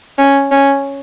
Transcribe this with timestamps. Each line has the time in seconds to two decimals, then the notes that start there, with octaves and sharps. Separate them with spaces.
0.18 C#4
0.51 C#4